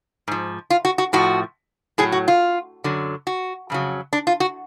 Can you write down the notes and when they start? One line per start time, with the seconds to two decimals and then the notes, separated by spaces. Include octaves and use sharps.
0.28 G#2 F3
0.70 F4
0.85 F#4
0.98 F#4
1.13 A2 F3 F#4
1.98 A2 F#3 G#4
2.12 F#4
2.28 F4
2.84 F#2 D3 F#3
3.27 F#4
3.70 F2 C#3 F#3
4.13 D4
4.27 F4
4.40 F#4